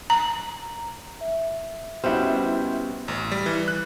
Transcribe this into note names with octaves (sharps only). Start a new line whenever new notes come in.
A#5
E5
G3 B3 C#4 E4 F#4 C5 D#5
A1
G3
E3
F#6